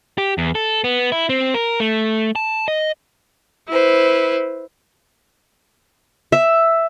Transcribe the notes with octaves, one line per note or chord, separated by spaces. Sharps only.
G4
E2
A4
B3
E4
C4
A#4
A3
A5
D#5
E4 B4 C5
E5